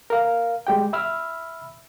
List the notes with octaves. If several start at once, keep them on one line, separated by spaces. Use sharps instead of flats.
A#4 F5
G#3 G4 G5
E5 B5 E6 F6